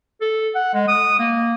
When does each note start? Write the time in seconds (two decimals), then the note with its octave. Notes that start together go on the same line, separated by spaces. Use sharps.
0.21 A4
0.55 F#5
0.74 G#3
0.88 D#6
1.19 A#3